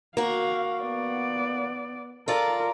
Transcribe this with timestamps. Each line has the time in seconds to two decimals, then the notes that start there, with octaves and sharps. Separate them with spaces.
0.17 A#3 F#4 F5
0.82 B3 D5
2.28 F4 A4 A#4 D5